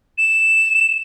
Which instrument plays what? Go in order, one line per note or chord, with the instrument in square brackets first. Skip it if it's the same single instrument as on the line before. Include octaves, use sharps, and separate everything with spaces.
[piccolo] E7